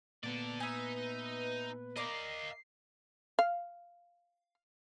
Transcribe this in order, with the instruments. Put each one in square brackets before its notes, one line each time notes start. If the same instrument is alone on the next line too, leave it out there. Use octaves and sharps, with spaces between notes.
[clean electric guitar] A#2 B3 [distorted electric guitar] A4 D5
[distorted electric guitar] D#4 [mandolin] G#4 E5 [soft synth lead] B4
[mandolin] A#4 D5 A#5 [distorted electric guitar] D#5 F5 [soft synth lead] C7
[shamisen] F5